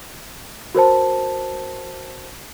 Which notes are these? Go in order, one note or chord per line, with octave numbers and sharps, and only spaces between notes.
F#4 A#4 C5 A5